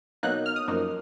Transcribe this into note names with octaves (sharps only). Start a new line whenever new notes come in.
B2 F#3 A#3 D#4 F#6
F6
D#6
F#2 F3 A#3 D#4